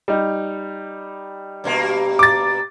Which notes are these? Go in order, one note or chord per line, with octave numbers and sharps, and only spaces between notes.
G3 D#4
G2 B2 A#3
D6 A6